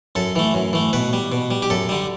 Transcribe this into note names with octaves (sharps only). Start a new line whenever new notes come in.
F#2 A4
E3 A3
F#2
E3 A3
B2 B4
G3
B2
G3
G4
F#2 A4
D3 G3